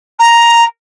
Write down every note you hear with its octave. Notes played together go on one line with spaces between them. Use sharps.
A#5